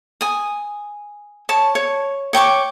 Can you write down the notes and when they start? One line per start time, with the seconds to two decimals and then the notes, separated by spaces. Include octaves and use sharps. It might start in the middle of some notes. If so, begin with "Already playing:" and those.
0.21 G#5 D#6
1.49 C#5 A5
1.75 C#5
2.33 C#5 G5 C#6 D6